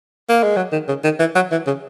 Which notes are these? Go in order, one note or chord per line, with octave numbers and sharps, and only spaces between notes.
A#3
G#3
F#3
D#3
C#3
D#3
E3
F#3
E3
C#3